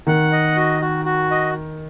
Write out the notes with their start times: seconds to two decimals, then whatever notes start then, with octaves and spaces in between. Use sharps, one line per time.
0.07 D#3 F#5
0.32 D#5
0.57 F#4
0.82 F#4
1.05 F#4
1.31 D#5